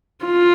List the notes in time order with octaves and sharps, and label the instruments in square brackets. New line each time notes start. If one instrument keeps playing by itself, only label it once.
[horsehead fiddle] F4